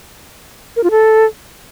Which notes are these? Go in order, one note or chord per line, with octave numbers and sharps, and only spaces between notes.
A#4
F4
A4